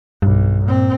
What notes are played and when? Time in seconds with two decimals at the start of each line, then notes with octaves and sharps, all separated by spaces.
0.22 B1 G2
0.65 A#2 C4